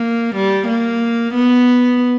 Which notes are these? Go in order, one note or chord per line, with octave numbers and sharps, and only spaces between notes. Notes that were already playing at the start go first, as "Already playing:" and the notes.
Already playing: A#3
G3
A#3
B3